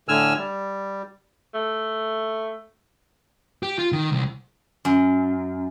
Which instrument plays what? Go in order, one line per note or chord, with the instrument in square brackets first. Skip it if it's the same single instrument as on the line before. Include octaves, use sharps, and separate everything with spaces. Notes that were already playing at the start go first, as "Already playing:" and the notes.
[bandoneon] A2 D3 G#5 E6 F6
G3
[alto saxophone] A3
[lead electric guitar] G4
F4
D#3
C2
[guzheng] F#2